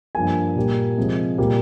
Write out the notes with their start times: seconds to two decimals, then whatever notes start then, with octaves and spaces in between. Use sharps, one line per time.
0.15 G2 F3 A#3 G#5
0.56 A#2 G3 A#3
0.97 C3 F3 G#3
1.38 A#2 G3 A#3